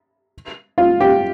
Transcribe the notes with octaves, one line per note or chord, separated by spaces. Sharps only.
F4
G4